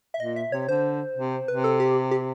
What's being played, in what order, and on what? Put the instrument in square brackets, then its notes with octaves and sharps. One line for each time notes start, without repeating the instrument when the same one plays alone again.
[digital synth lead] E5
[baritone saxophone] A#2 [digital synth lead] D#5
[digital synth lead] E5
[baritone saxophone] C3 [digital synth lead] C#5
[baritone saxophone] D3 [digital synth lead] C5
[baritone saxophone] C3
[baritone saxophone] C3 [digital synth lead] B4
[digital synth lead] A4
G4
G4